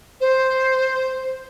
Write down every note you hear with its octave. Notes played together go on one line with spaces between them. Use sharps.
C5